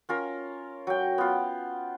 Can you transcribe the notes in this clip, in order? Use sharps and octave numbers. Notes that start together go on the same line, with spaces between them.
C#4 F4 A#4
F#3 G5
B3 F4